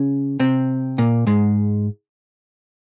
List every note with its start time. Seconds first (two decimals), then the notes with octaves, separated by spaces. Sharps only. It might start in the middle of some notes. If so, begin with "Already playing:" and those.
Already playing: C#3 C#4
0.40 C3 C4
0.98 A#2 A#3
1.27 G#2 G#3